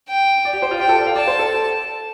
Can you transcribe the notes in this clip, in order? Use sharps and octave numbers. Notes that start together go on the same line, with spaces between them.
G5
D5
G4
C5
F4
G4 G5
A4
D5
F5
D5 A5
C5
A4